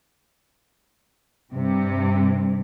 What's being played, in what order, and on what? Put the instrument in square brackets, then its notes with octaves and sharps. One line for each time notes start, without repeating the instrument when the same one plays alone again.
[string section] G2 C3